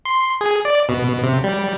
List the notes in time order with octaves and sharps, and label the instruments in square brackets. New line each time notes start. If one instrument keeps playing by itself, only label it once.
[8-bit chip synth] C6
G#4
D5
B2
C3
G3